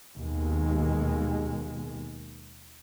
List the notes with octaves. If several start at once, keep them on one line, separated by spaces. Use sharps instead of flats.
D#2 B2 G#3